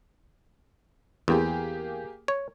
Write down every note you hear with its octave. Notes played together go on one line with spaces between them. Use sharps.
E2 A#3 G4 G#4
C#5